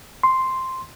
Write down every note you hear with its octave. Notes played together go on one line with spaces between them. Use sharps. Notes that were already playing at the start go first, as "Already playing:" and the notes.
C6